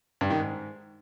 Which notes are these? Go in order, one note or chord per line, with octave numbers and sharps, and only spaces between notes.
G2
D#3
G#2